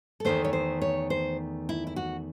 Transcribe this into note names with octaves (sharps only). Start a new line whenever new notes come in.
A4
E2 D#3 A3 C5
C#5
C5
C#5
C5
E4
E4
F#4